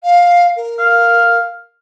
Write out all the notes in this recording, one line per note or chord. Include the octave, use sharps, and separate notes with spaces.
F5
A#4
F5